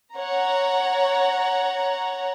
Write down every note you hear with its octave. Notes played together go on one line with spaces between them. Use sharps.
C#5 F#5 A#5